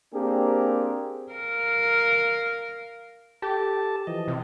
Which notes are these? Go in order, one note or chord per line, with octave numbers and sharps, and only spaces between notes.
A#3 C4 D4 G4 G#4 A#4
A#4 F5
G4 A4 A5
E3 F3 D#5
C3